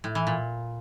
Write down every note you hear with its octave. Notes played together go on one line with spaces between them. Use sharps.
A2
E3
A#2